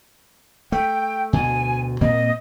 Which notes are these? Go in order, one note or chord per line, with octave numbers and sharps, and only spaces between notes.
A3 G5
D2 B2 G#5
A#2 A#3 C4 D#5